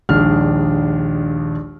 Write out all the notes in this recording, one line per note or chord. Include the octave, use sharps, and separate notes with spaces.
A#1 D#2 G#3 D4 F6